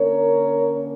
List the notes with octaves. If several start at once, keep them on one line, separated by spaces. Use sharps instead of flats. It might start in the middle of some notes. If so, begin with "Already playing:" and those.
Already playing: D3 A#3 C#4 A#4 C#5